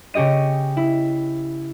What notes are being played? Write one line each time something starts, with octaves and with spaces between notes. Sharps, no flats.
C#3 C#4 G4 D#5 D#7
E4